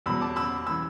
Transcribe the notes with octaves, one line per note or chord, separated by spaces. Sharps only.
E2 B2 F#3 B5 E6
A5 D6
B5 E6
E3 B5 E6